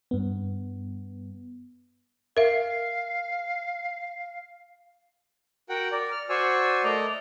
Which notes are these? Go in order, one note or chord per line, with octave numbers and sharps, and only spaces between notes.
G2 B3
A#4 E5 F5
F#4 A#4 F#5 G5
A#4 D5
F6
F#4 C5 D5 G#5 C#6 E6
A3 A#4 D5 D#5 A#5